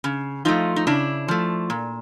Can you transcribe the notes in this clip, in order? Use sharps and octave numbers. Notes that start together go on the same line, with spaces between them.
C#3
F3 A3 D#4 F4
D#4
C#3 D4 E4
F3 A3
A#2